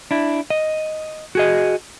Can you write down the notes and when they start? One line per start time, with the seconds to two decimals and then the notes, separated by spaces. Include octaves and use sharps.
0.11 D4 E4
0.50 D#5
1.35 F#4 G#4 D#5